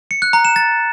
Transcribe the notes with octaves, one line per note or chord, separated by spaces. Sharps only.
C#7
F#6
A#5
E7
A6